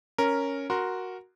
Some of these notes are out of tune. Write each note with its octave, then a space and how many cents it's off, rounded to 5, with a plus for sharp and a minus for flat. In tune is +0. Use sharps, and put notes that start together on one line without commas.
C#4 +0 A#4 +0
F#4 +0 A#4 +5 C6 +0